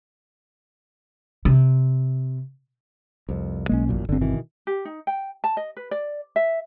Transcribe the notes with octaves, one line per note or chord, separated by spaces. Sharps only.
C3
C2 F2
B1 G#3 A#3 C#4
A1 F#2 A#2
G1 G2 D3 C4
B2 D#3 E3
G4
D#4
G5
A5
D#5
B4
D5
E5